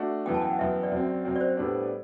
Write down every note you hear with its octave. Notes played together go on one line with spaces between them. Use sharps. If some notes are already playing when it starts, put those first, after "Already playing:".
Already playing: A3 D4 F#4
F#2 E3 B3 G5
A5
G5
F#5
F#2 E3 B3 E5
D5
F#2 F#3 C4
F#2 F#3 C4
D5
C5
A2 G3 B3 D4